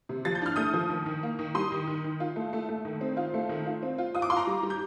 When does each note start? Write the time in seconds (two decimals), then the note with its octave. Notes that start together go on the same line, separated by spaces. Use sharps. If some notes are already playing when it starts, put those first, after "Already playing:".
0.09 C3
0.25 F3 A6
0.35 G6
0.42 D4 F6
0.56 A3 D#6 G6
0.73 F3
0.90 D#3
1.06 D#3
1.23 A#3
1.39 D#3
1.54 G3 C6 D#6
1.72 D#3
1.87 D#3
2.04 D#3
2.20 F4
2.36 A3
2.53 A3
2.69 A3
2.85 D#3
3.01 C4
3.17 F4
3.34 A3
3.49 D#3
3.66 F4
3.83 C4
3.98 F4
4.15 F4 D#6
4.22 D6
4.30 F4 C6
4.36 A#5 D6
4.47 G3
4.63 G3
4.70 G6